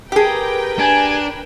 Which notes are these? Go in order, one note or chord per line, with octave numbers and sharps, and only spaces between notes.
G4 G#4 A#4 B4 G5
D4 G#5